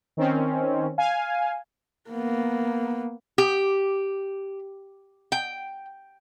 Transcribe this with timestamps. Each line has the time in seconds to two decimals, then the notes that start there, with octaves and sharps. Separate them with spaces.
0.17 D#3 C4 C#4
0.98 F5 G#5
2.10 A#3 B3
3.38 G4
5.32 G5